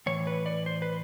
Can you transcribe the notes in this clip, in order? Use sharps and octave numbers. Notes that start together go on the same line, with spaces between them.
A2 E3 C#5
B4
D5
C5
B4